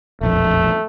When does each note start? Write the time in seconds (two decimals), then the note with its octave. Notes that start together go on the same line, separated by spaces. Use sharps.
0.21 E1 A#1 F2 A3